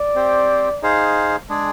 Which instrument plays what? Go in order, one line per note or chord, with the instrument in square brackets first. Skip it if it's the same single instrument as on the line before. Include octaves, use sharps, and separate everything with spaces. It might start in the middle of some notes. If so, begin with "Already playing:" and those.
Already playing: [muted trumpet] D5
[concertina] C4 G4 C5
D#4 G#4 C5 F5
G#3 D4 G#4